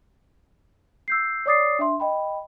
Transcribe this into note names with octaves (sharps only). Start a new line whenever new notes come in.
E6 G6 C7
C#5 D5 D6 D#6 A6 C7
D4 E5 C6
D#5 G5 B5